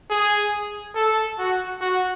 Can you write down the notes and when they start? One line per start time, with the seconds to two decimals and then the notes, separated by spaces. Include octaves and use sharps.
0.10 G#4
0.95 A4
1.38 F#4
1.81 F#4